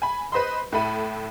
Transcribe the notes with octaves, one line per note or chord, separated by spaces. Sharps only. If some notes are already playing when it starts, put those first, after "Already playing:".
G#5 B5
B4 C5 D#5 B5 C6
A2 E4 A4 B5 D#7